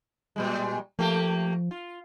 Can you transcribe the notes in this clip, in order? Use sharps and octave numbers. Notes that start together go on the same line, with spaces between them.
A#2 G3 G#3
F3 A3 A#3 G4
F4